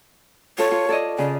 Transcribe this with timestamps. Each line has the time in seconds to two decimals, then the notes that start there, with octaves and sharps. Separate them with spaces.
0.58 F4 A4 C#5
0.71 F4
0.89 A4 D5 D#5
1.18 C#3 G#4 D5